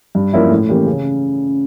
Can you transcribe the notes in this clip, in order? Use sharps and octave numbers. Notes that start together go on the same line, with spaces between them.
G2
F3 A#3 C#4 E4
A2
E3 A#3 C#4 G4
C#3